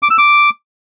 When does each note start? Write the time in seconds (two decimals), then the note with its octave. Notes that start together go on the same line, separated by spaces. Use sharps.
0.03 D6
0.10 E6
0.18 D6